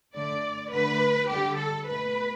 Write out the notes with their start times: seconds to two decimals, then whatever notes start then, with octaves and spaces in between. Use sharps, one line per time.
0.15 D3 A3 D5
0.72 D3 A3 B4
1.29 D3 G3 G4
1.58 A4
1.87 B2 A3 B4